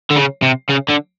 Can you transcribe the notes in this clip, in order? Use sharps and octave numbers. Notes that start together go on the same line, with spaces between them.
D3
C#3
C3
C#3
D3